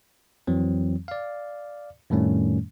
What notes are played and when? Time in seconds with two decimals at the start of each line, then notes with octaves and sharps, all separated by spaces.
0.47 F2 E3 F#3 C4
1.08 D5 F5
2.10 F2 A2 D#3 G3 A3 C#4